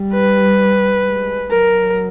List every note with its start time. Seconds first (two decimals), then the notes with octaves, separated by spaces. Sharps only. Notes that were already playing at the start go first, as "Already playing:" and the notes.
Already playing: G3
0.14 B4
1.05 G#3
1.51 F#3 A#4